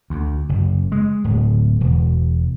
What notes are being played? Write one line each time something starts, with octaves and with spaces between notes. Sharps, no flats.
D2
F#1
G#3
D1
E1